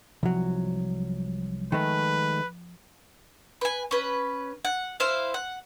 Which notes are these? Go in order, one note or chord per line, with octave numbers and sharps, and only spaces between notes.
C2 F3 F#3
D#3 G#3 A3 B4
B4 G#5
C#4 B4
F#5
E4 C5 F5
F#5